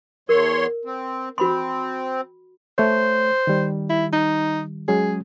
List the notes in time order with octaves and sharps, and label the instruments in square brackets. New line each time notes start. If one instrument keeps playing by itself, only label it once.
[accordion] E2 C#5 C6 [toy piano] A#4
[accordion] C4
[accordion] C4 [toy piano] F#4 B5 C6
[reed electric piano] A3 C#5 [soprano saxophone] C5
[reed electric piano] D#3 G3
[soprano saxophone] E4
D#4
[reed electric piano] F#3 G#3 C#4 [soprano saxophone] G#4